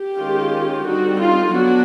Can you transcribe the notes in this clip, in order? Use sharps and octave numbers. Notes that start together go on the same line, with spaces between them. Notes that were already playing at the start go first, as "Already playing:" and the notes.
Already playing: G4
D#3 G#3 C#4 F4
D3 G3 C4 D#4 F#4
F4
F#3 B3 D4 F#4